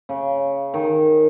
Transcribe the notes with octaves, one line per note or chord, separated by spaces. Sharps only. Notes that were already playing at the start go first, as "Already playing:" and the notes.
C#3
D#3